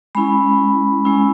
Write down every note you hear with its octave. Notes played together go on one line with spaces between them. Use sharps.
G#3 C#4 E4 B5
G#3 C#4 E4